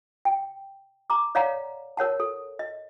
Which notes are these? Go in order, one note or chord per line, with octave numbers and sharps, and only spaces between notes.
G5
A#5 D6
C#5 D5 F5 F#5 A#5
A#4 C#5 F#5 A5
A4
D#5